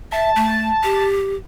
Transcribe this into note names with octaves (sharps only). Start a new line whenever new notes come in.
E5 A5
A3
G4